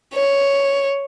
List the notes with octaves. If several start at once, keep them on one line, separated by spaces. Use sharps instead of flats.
C#5